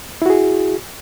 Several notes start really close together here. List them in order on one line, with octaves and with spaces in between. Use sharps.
E4 F#4 G#4